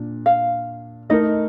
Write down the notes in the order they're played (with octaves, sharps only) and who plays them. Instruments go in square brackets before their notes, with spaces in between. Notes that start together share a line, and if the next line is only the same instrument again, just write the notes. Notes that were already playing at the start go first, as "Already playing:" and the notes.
Already playing: [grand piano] A#2 D4
[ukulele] F5
[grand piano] A3 D#4 A#4 [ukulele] D#5